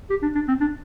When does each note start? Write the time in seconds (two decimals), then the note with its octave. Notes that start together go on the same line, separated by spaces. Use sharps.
0.10 G4
0.22 D4
0.35 D4
0.48 C4
0.61 D4